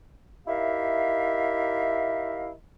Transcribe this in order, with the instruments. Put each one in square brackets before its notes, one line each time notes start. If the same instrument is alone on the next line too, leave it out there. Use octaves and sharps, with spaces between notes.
[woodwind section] D#4 E4 G4 A#4 E5 F5